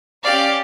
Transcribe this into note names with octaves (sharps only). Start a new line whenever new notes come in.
C#4 G4 D5 F5